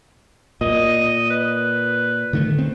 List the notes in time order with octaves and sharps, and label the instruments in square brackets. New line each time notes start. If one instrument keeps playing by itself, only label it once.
[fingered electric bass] A#2 [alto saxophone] D#5
[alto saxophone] B4
[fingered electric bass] D3 D#3 A3
C4